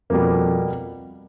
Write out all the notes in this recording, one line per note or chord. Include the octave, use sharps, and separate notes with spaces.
F2 B2 G3 A#3